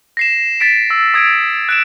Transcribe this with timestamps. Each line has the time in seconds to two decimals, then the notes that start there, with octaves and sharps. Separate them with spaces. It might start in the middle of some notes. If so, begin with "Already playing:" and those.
0.17 A#6 C7 E7
0.60 A6 B6 D7
0.90 E6
1.14 D#6 G#6 A6 D7
1.69 F#6 D7 E7